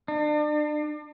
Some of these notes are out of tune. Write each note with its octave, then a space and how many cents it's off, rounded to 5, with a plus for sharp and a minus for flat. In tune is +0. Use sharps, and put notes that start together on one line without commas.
D4 +35